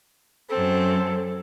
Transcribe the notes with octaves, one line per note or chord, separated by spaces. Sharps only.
F#2 C4 A4